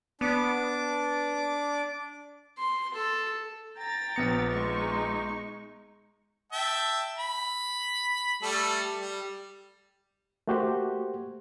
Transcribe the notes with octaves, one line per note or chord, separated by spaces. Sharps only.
B3 D4 D6
C6
A4
G5 A#5 A6
A#1 B3 C#7
G#3 D#4 C#6
E5 G5 A5
B5
G3 A3 A4
G3
A3 A#3 F#4 G4 C5